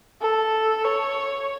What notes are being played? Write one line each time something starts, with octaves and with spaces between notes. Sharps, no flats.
A4
C#5